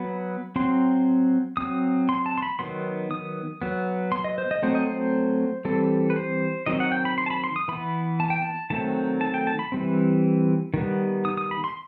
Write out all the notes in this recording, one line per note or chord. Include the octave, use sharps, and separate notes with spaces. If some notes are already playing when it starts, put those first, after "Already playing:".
Already playing: F#3 B3 B5
F#3 C4 C6
F#3 C4 D#6
C6
A5
C6
B5
D#3 F#3 B3 C6
D#6
F#3 B3
C6
D#5
C5
D#5
F#3 A3 C4 C5
D#5
C5
E3 G3 C4 A4
B4
C5
D#3 F#3 C4 D#5
F#5
G5
B5
C6
A5
B5
C6
D#6
E3 B3 B5
A5
G5
A5
D#3 F#3 A3 C4 A5
A5
G5
A5
B5
E3 G3 C4
D#3 G3 B3
D#6
D#6
B5
C6